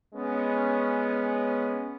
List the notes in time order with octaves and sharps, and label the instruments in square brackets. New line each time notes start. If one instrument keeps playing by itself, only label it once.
[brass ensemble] G#3 B3 C#4